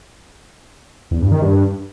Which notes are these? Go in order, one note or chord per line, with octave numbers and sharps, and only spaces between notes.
E2
G2
D#3
G2